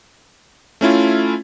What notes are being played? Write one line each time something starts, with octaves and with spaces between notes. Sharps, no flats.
A3 C#4 E4 F4